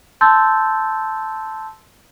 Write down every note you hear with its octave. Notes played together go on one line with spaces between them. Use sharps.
A5 C6 E6 G6 A6